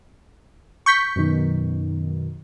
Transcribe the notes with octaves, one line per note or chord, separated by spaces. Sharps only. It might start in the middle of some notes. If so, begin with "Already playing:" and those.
C#6 G6 B6
F#2 B2 D#3